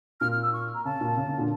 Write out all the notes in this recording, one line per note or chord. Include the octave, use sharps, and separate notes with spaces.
A#2 F6
F6
E6
C#6
A#5
C#3 A5
A#2
C#3
C#3
A#2 D3